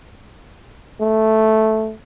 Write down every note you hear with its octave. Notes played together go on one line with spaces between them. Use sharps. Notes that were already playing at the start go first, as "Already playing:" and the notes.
A3